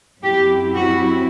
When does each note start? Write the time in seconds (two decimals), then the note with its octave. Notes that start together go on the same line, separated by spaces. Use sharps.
0.22 F#2 F#3 C4 E4 G4
0.74 F#4